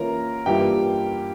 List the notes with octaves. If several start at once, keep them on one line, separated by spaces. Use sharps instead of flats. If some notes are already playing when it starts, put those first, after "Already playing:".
Already playing: E3 A#3 C#4 F4 A#4 A#5
G2 E3 A#3 F4 G4 G5